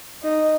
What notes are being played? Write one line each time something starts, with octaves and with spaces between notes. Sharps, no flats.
D#4